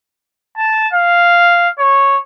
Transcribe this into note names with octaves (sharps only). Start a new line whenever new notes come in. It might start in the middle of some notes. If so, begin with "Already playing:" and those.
A5
F5
C#5